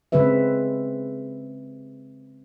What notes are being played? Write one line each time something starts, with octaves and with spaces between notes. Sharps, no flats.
C#3 G#3 C4 B4 E5